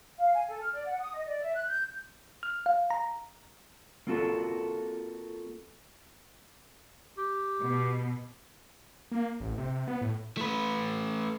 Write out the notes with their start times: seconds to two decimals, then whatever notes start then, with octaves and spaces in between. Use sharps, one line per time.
0.19 F5
0.33 G#5
0.48 A4
0.60 F6
0.72 D5
0.87 F#5
0.99 D#6
1.13 D#5
1.27 D5
1.41 E5
1.55 F#6
1.67 G6
2.43 F6
2.66 F5
2.90 A#5
4.07 A#3 C4 F4 F#4 A4
7.18 G4
7.60 B2
9.11 A#3
9.40 A1
9.58 C3
9.87 B3
10.01 A2
10.37 A3 B4